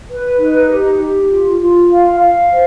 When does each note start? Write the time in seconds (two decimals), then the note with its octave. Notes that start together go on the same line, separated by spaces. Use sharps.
0.09 B4
0.39 D#4
0.69 G4
0.99 G4
1.30 F4
1.59 F4
1.90 F5
2.19 F5
2.49 C5